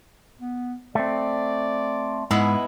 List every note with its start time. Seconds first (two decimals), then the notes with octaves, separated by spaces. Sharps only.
0.40 B3
0.95 A3 C4 D5
2.31 G#2 G#3 B3 E4